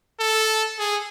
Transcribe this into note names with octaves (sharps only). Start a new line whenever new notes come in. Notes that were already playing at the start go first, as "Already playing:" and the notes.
A4
G#4